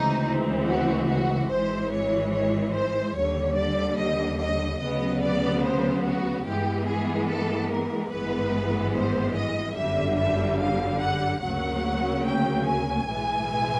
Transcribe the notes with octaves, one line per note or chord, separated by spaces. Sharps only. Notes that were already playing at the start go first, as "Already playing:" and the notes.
Already playing: D2 C#3 E3 G#3 C4 D#4
F#4
F#4
G#1 G#2 E3 G#3 C5
C#5
C#5
C5
D#2 D3 G3 C#5
D5
D#5
D#5
D2 C#3 F#3 B3 D#5
D5
C5
F#4
G2 E3 G#3 B3 G4
G#4
A4
A#4
G#1 G2 E3 G#3 B3 B4
C5
D#5
G1 F#2 D3 G3 E5
E5
F5
F#5
D2 C#3 F#3 A#3 F#5
G5
G#5
B1 A2 E3 G#3